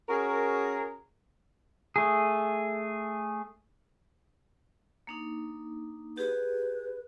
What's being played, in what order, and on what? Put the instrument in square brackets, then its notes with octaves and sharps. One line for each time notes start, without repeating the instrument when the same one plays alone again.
[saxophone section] C#4 F#4 G#4 A#4
[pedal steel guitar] A3 G#4
[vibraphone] A#3 D4 D#4
[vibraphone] G4 G#4 [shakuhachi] B4